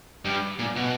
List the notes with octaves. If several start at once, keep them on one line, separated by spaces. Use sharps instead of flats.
G2
A#2
B2